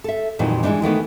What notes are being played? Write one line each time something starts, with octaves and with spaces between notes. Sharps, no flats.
A4 E5
F2 A#2 D#3 E3 F#3 G3
E3 G#3 A#3 D4 D#4
D#3 E3 A3 B3